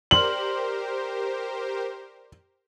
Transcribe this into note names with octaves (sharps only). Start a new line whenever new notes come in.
G4 A#4 C5 D5 C6 F6 F#7